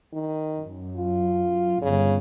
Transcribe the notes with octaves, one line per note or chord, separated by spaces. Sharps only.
D#3
F#2
F4
G1 C#3